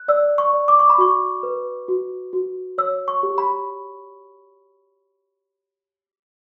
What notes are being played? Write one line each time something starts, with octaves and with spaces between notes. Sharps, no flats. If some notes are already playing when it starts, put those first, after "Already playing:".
Already playing: F#6
D5 E6
C#6
D5
D6
C#6
B5
F#4 C#6
B4
F#4
F#4
C#5 E6
C#6
G4
B5